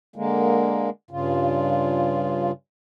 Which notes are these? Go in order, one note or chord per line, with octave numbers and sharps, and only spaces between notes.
D3 G#3 A#3
G2 C#3 F4